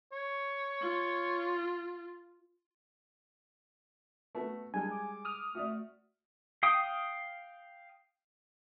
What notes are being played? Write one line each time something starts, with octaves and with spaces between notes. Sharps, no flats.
C#5
F4
A3 B3 F#4
G3 G#3 D4 G#5
D6
D#6 F6
A3 F#4 D5
F5 G5 D#6